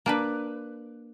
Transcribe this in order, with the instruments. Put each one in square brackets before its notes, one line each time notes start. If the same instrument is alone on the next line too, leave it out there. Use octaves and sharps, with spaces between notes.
[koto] A#3 D4 B4